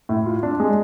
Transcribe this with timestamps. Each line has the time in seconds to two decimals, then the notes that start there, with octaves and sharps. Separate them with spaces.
0.09 A2
0.26 F4
0.43 D4
0.60 G#3